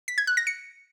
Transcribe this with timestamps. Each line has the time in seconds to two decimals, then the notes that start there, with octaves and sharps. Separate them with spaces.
0.08 B6
0.18 G#6
0.27 F#6
0.37 A#6
0.47 C#7